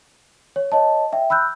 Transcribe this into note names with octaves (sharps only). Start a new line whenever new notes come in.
C#5
C#5 D#5 A5
E5 G5
B5 E6 F#6 G6